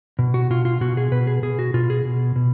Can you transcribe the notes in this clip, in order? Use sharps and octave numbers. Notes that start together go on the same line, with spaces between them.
B2
F#4
B2 F4
F4
B2 F#4
G#4
B2 B4
G#4
B2 G#4
F#4
B2 F4
G#4
B2
B2